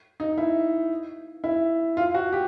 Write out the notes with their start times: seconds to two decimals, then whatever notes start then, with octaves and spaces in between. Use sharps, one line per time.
0.20 D#4
0.38 E4
1.44 E4
1.97 F4
2.14 F#4
2.33 G4